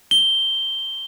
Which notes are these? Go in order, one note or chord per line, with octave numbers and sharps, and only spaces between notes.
G7